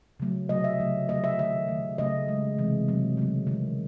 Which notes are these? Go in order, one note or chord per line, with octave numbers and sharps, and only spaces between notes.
C#3 F#3 A3
C3 F#3 A3 D#5
E5
C#3 F#3 A3
D#3 F#3 A3 D#5
E5
D#3 A3 E5
D#3 A3
C#3 F#3 A3 D#5
C#3 G#3
C3 E3 G#3
C3 F#3 A3
C#3 F#3 A3
D#3 G#3